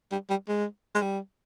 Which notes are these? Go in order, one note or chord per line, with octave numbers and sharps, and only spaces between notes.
G3
G3
G#3
G#3
G3